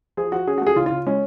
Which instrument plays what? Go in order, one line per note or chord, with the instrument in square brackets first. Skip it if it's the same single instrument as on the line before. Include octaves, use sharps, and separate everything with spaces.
[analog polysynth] F3 [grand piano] G#4
[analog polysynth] F3 [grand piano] F#4
[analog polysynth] C#4 [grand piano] G#4
[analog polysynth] A3 [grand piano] F#4
[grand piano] G#4
[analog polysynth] C#3 [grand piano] F4
[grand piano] F4
[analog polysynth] C#3
[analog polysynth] G#3 [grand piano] C#4